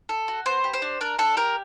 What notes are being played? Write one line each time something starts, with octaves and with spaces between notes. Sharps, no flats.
A4
F#4
B3 C5
G4
C5
D4
D4 A#4
D4 A4
G4 A#4